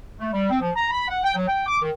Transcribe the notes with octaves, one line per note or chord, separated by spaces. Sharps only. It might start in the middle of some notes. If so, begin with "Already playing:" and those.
A3
G3
C4
F3
A#5
B5
F#5
G5
F#3
G5
D6
D#3